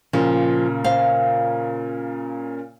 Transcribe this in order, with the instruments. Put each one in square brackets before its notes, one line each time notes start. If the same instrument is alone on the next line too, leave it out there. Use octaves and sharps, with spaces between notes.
[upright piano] A#2 C#3 [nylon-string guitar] F3
[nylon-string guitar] C5 F5